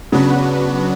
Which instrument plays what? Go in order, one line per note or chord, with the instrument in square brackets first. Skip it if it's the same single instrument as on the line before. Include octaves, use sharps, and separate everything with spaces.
[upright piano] C#3 [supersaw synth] F#3 B3 D4 F#4 B4